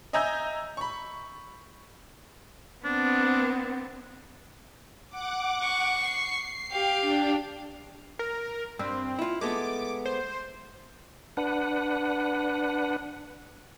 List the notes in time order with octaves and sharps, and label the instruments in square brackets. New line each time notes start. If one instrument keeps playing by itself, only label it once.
[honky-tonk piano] D#5 E5 G#5 A#5 E6 G6
B5 C#6
[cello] B3 C4 [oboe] D4
[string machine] F#5 D6
[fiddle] C#6
[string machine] C7
[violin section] G4 [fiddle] F5 G5
[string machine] D4
[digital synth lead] A#4
[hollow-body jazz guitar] G2 [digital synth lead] C4
[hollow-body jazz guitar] E4 F4
[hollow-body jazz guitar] G#3 A3 B3 [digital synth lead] D6
[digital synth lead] C5
[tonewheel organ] D4 B4 F#5